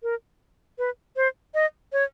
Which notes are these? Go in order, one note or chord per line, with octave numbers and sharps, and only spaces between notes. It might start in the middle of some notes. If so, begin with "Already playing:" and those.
A#4
B4
C5
D#5
C#5